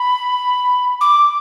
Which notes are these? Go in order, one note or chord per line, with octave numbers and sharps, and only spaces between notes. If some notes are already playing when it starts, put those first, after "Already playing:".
Already playing: B5
D6